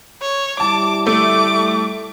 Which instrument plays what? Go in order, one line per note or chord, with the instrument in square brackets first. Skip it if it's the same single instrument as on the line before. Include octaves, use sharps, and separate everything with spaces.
[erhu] C#5
[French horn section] G3 E4 [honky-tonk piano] A5 [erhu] D6
[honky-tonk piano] A3 [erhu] D6